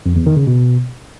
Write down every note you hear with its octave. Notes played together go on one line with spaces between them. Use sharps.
F2
E2
D#3
C#3
B2